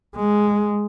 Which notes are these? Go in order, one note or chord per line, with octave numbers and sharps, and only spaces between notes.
G#3